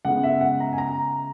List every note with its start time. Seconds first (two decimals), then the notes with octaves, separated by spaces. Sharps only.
0.05 C#3 G#3 B3 E4 F#5
0.23 E5
0.41 F#5
0.60 A#5
0.73 G#5
0.78 A#5